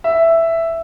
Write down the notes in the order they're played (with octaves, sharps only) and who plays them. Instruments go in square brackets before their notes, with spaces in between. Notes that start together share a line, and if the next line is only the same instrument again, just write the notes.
[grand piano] E5